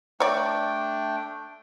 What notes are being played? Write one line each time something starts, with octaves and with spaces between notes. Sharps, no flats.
A3 D4 C#5 D5 G5